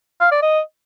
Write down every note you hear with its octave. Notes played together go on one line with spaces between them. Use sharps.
F5
D5
D#5